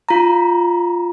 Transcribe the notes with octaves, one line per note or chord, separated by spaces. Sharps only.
F4 A#5